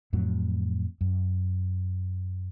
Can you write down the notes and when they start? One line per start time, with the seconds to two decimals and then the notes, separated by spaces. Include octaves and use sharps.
0.13 F2 A2 F#3
1.01 F#2